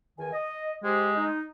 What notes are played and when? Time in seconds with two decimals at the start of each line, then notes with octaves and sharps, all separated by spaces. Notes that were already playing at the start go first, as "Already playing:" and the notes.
0.18 E2 D#3 G#5
0.32 D#5
0.83 G#3 G4 C5
1.15 D#4